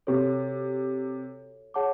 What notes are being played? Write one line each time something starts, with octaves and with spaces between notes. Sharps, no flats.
C3 F#4 A4 C#5
G#4 C#5 F#5 A5 D6